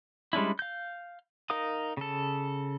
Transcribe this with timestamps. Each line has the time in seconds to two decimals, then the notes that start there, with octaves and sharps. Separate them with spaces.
0.33 G3 G#3 C#4 D4 E4
0.59 F5 G6
1.50 D#4 A#4 F5 D#6
1.97 C#3 A4